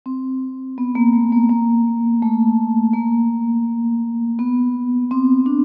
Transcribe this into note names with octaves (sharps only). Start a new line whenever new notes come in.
C4
B3
A#3
A3
A#3
A#3
A3
A#3
B3
C4
D4